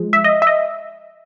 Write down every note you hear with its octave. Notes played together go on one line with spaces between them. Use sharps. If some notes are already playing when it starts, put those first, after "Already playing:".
Already playing: F3 G#3
E5
D#5
E5
D#5